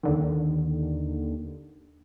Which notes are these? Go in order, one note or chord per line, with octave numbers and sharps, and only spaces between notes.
D#2 D3 D#3